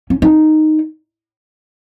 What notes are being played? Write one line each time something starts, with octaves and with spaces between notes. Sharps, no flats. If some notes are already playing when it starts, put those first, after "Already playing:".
C#4
D#4